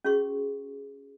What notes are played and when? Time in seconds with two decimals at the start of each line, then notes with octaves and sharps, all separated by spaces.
0.04 C#4 F#4 G#4 C6 C#6